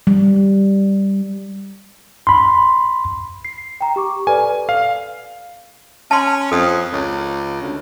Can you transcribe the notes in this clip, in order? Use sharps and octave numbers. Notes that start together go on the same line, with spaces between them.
G3
B5 C6
C7
G5 A#5
G4 C#6 D6
A4 B4 D5 G#5
F5
C#4 A5 C6
F2 A4 D#6
C#2
D2